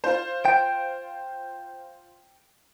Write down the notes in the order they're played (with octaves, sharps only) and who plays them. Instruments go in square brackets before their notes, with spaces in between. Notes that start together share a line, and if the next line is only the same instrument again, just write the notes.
[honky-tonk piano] F4 C5
[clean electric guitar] G5